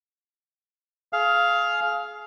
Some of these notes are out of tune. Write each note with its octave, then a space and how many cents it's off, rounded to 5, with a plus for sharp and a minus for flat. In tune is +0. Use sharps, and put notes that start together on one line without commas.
G#4 +30 F5 +0